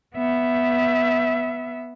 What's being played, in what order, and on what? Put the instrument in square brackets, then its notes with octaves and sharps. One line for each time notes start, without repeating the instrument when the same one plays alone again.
[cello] B3 E5